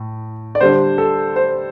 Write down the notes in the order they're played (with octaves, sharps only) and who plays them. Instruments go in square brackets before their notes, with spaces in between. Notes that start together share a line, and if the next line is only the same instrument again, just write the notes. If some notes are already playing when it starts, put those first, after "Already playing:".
Already playing: [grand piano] A2
D5
D3 G3 D4 C5
A4
C5